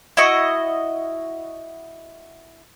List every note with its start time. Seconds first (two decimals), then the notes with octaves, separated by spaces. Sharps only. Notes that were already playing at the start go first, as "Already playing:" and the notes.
0.17 E4 F#4 D#5 C#6